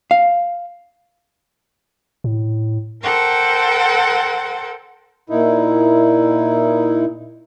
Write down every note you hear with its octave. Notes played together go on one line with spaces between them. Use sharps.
F5
A2
A4 A#4 C5 F#5 G5
A#2 D#4 E4